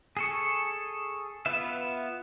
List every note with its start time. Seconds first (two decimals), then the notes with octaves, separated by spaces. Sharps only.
0.17 G#4 A4 C#6
1.46 B3 F4 B4 E5